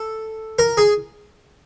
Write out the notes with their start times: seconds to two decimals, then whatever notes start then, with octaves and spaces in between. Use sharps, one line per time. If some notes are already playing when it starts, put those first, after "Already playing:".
Already playing: A4
0.59 A#4
0.77 G#4